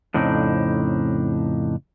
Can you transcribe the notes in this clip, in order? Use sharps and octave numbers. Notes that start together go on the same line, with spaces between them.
F2 A2 C#3 C4 D4 D#4